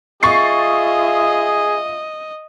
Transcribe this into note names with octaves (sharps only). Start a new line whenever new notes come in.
F4 G#4 D#5 E5 C#6 A6 C7